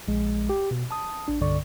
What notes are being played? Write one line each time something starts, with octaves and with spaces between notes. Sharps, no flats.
A#1 G#3
G4
B2
A5 D#6
A1 D4
C2 G2 D3 D5 C#6